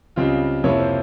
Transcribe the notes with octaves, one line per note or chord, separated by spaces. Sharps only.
C#2 C#3 G3 C4 F4
F2 C3 F3 A#3 E4 C#5
C5